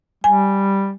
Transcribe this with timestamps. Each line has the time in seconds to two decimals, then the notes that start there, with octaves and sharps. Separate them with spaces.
0.24 G3 G#5